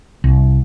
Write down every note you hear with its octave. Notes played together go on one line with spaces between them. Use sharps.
C2